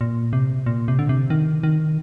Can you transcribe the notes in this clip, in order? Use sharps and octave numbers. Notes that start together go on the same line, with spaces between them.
A#2
C3
A#2
C3
D3
C3
D#3
D#3